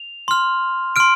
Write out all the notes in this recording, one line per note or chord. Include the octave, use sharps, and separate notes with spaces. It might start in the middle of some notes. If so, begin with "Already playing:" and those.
Already playing: F7
C6 F6
C6 F6 D7